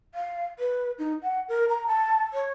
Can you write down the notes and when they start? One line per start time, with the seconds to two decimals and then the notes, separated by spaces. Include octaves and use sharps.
0.15 F5
0.59 B4
0.99 D#4
1.23 F#5
1.49 A#4
1.69 A#5
1.87 A5
2.34 C#5